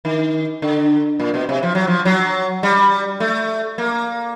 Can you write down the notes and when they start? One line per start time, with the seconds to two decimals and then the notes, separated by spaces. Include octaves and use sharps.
0.05 D#3
0.62 D3
1.20 A#2
1.34 B2
1.49 C3
1.63 F3
1.75 F#3
1.87 F3
2.06 F#3
2.63 G3
3.20 A3
3.78 A#3